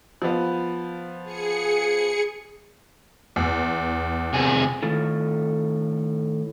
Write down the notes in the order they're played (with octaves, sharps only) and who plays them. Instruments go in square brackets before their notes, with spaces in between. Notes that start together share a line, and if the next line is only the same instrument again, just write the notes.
[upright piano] F3 B3
[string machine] G#4 C#7
[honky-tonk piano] E2
[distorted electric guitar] C2 G#4
[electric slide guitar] A2 D#3 F4 A4